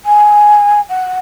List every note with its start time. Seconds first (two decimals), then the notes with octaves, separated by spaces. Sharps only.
0.05 G#5
0.89 F#5